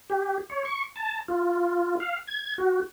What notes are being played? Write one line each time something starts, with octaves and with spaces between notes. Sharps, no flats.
G4
C#5
C#6
A5
F4
F5
G#6
F#4